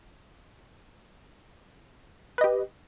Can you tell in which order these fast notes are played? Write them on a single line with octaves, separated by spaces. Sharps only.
B4 D#5 G4